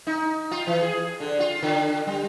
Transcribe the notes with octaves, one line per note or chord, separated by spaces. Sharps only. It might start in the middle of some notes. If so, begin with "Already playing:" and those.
D#4
F4
E3
G#4
D3
F4
D3
G3